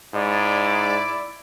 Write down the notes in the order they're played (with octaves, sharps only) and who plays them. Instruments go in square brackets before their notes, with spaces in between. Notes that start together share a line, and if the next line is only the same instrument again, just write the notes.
[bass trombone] G#2 [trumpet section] E4 D5